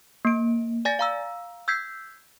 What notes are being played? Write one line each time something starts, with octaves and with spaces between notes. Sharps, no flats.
A#3 D7
D5 G#5 A6 A#6
F5 A#5 E6
E6 G6 G#6 B6 C7